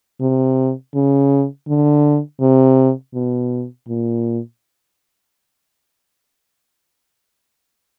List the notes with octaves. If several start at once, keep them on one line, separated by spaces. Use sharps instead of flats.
C3
C#3
D3
C3
B2
A#2